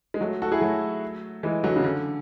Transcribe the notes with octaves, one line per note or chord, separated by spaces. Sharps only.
G#3
F#3 A3
F#4 A4
E4 G#4
F#3 A3
E3 G#3
D3 F#3
C#3
D3